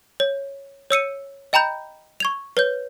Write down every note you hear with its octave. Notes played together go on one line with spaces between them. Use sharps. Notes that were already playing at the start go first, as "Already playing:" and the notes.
C#5
C#5 E6 C#7 D#7
D#5 G5 A#5 B5 G6
C#6 G#6 F7
B4 C#5 G6